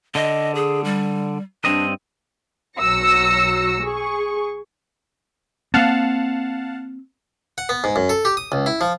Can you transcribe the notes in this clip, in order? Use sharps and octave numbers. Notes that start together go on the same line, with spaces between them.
D3 D#5
G#4
G3
G2 C4 D4 D#5
B1 F#3 E6 A#6 C#7
G#4 C#6
A#3 C4 F5 F#5 A5
F#5
B3
G#2
F#2
A4
G4
D#6
C#2
E4
F3